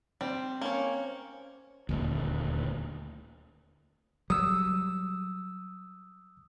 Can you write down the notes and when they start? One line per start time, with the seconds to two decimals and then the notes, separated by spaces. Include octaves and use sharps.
0.21 G3 C4
0.61 A#3 C#4 C#5
1.89 D#1 G#1 D2
4.30 F#3 G3 D#6 E6